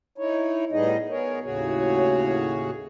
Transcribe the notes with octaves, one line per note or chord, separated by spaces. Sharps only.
D#4 E4 C#5
A2 G3 B3 D#4 G#4 D#5
B3 G#4 A#4 C#5
D#2 A2 C#3 F#4 G#4 C#5